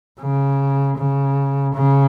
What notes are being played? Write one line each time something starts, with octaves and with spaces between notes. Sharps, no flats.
C#3
C#3
C#3